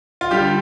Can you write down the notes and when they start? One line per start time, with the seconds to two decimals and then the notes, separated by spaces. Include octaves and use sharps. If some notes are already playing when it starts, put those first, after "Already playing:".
0.21 F4
0.31 D3 G3 G4